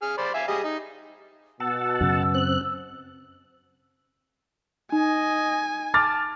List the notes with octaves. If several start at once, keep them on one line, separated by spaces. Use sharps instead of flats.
G#4 F6
C5 D5 B5
E5 F5 G#5
G3 G#4 D#5
D#4
B2 F#5 A5 E6
F#2 C#3
C4 F#6
D#4 D#5 G#5
A5 D6 F6 A6